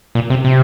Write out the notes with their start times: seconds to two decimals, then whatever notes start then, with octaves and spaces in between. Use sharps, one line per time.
0.15 A#2
0.30 C3
0.45 C3